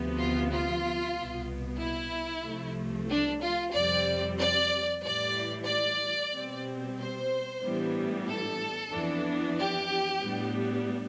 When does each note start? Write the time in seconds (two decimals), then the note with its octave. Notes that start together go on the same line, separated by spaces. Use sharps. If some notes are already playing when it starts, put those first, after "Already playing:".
Already playing: D2 C3 F3 B3
0.18 F4
0.50 F4
1.15 C2 B2 B3
1.79 E4
2.44 C2 C3 F3 A3
3.09 D4
3.42 F4
3.74 F2 C3 G3 C4 D5
4.39 D5
5.03 A2 E3 G3 D5
5.68 D5
6.33 B2 G3 C4
6.98 C5
7.62 A2 E3 G3 B3 D4
8.28 A4
8.92 F2 E3 B3 D4
9.58 G4
10.22 A2 G3 B3 D4